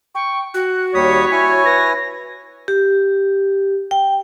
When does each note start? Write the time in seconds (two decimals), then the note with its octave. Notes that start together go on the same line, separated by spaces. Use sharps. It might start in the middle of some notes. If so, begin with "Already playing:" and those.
0.15 G5 C#6
0.54 F#4 F#6
0.95 D#2 G3 C#5 D#6 B6
1.32 E4 G#5
1.65 B4 A#6
2.68 G4
3.91 G5